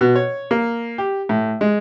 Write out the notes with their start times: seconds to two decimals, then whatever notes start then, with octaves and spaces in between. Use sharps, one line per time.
0.01 B2
0.16 C#5
0.51 A#3
0.98 G4
1.29 A2
1.61 G#3